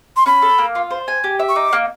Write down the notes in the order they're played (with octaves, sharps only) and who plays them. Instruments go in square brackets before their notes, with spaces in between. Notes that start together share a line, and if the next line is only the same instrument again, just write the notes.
[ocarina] C6
[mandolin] C#4 [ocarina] B5
[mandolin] A4
A#3
F4
C5
G#5
G4
E5
[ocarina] C#6
[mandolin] D#4 [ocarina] D6
[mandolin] A#3